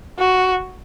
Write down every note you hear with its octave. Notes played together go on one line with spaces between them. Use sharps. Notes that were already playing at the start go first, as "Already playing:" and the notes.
F#4